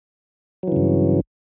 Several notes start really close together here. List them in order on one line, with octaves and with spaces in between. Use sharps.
F#3 E3 C#3 G2